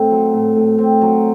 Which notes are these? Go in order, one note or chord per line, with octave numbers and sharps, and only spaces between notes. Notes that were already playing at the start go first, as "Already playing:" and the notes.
Already playing: A2 C4
F#3
A2
A2
C4
F#3